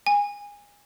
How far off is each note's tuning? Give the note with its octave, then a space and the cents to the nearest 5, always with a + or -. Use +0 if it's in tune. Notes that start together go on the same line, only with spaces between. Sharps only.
G#5 -20